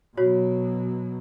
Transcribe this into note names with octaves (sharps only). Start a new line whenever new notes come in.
B2 F#3 F#4 C#5